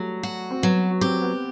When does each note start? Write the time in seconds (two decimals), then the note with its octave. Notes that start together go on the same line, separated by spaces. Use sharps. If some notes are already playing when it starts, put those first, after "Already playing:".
Already playing: F#3 G3 A3
0.23 F#4
0.51 C4
0.62 F#3 B3
1.01 C4 G4
1.22 B3